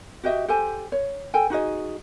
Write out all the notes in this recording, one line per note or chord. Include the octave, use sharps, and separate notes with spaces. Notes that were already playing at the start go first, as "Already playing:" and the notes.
F#4 G4 D#5 E5
G4 A4 C5 G#5
C#5
A4 G5 G#5
D#4 F#4 G#4 D#5